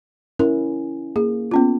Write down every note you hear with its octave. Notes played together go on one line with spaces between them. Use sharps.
C#4 E4 A#4
A#3 G#4
B3 C#4 F4